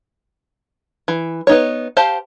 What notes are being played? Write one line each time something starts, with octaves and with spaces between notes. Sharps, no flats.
E3
B3 D#4 C#5
G4 C5 F5 A5